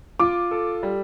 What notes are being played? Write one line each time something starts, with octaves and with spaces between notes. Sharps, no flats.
F4 D6
A4
G3